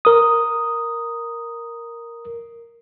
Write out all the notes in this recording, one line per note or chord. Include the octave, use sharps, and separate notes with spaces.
A#4 D#6